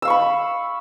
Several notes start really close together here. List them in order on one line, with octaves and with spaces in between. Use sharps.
E6 F5 C#6 B5